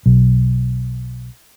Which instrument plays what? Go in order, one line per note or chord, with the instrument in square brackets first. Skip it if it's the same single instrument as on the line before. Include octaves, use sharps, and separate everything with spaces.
[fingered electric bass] B1